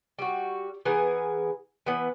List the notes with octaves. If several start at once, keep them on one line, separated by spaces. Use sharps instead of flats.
G3 F#4
E3 B3 G#4 A#4
E3 B3